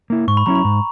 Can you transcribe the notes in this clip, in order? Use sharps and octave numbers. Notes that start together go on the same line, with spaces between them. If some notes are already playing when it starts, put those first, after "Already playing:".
A#3 E4
G#2 C#6
B5
F#3 C#4 E4 A#5
B5
G#2